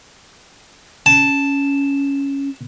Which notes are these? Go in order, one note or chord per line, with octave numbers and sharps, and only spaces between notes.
C#4 A5